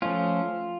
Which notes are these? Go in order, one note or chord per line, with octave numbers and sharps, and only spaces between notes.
F3 A3 C#4 F4